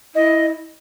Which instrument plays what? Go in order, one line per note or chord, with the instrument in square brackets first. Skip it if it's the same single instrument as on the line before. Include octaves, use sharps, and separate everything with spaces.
[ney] E4 [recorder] D#5